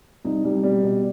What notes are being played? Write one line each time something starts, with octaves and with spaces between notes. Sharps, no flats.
C2 D#4
C2 G3
B2 G3
B2